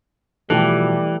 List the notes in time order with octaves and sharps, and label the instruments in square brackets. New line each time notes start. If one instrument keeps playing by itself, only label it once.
[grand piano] B2 F3 [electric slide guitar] E3 [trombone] G3 [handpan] A3 G4 A4